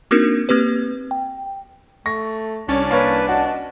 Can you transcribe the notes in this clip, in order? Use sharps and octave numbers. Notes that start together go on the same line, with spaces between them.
A#3 C4 D4 D#4 F#4 A#4
A#3 C4 G4 B4
G5
A3 C#6 A#6
C2 C#4 D4 A6
A#3 B4 C#5
F#4 D#5